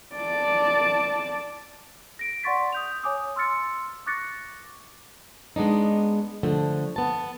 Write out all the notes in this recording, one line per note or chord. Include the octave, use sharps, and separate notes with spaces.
D5 A5
A#6 D7
D5 F#5 C6 C#6 A6 B6
D#6 G6 F7
C#5 G#5 D6 D#6
C6 E6 F6 A6 C#7
C#6 D6 F#6 A6 A#6 C#7
G#3 B3 D4 D#4
D3 F3 A3
B3 A5